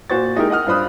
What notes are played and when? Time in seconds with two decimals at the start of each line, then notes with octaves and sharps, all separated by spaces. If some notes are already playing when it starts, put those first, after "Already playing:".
0.10 A#2 F#4 C5 C#6 A6
0.35 G#3 D#4 E4 G4 A#4
0.50 D#5 F#5 D#6 F6
0.67 G2 F4 C5 B5 D#6 F#6